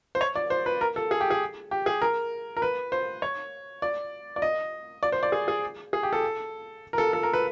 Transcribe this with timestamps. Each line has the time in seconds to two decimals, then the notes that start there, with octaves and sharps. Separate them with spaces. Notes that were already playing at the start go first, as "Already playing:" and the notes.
0.15 C5
0.21 C#5
0.36 D5
0.50 C5
0.66 B4
0.81 A#4
0.96 A4
1.11 G#4
1.21 G4
1.30 G#4
1.71 G4
1.86 G#4
2.02 A#4
2.57 A#4
2.62 B4
2.92 C5
3.22 C#5
3.82 D5
4.36 D5
4.42 D#5
5.03 D5
5.12 C5
5.23 D5
5.32 G#4
5.48 G#4
5.93 G#4
6.03 G4
6.13 A4
6.93 A#4
6.98 A4
7.13 A4
7.23 A#4
7.33 B4